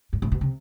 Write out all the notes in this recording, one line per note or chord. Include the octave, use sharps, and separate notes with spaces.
G2
A2
B2
C3